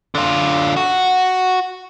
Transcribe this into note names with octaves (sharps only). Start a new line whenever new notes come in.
D3 F4
F#4